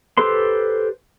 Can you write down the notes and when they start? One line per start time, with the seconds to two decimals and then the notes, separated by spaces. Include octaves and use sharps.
0.18 G4 A4 B4 C5 C6